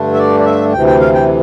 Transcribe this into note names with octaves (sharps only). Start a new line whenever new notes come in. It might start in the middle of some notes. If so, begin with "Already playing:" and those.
Already playing: G2 D3 A3 D4
E5
D5
D5
E5
D2 C3 E3 G5
G5
F5
G5